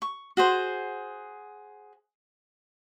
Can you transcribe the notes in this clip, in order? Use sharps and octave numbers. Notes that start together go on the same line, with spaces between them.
C#6
F#4 G#4 C5